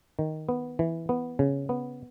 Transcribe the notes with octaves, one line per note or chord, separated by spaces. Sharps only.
D#3
B3
E3
B3
C#3
B3